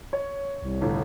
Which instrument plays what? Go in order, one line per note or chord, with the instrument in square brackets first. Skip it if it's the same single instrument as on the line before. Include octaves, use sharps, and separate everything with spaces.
[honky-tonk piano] C#5
[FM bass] C2
[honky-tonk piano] G1 A2